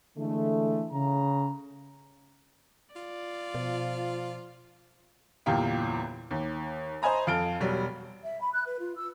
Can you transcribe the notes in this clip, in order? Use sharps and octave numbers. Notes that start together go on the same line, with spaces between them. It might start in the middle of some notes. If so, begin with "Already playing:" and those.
D3 E3 G#3 A3
C#3 A#5
F4 D5
B2 F3
G1 E2 A#2 G4 F5 G5
D#2
C5 D#5 G#5 A#5 B5
F2 F4 A4 F6 D7 G7
E1 F#3 G3
E5
B5
F#6
B4
F4
E6